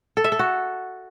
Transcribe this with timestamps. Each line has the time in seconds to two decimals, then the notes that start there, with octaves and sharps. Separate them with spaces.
0.17 A4
0.24 E5
0.32 A4
0.39 F#4